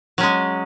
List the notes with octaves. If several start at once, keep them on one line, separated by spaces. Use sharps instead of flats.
F#3 G#3 C#4